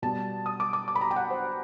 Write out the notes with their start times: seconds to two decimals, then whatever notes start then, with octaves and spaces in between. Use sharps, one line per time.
0.02 B2 G3 A5
0.46 D#6
0.60 D6
0.73 D6
0.88 D6
0.96 B5
1.01 A#5
1.11 G5
1.16 F#5
1.30 C5